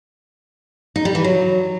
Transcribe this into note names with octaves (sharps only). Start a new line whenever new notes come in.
D#4
G3
E3
F#3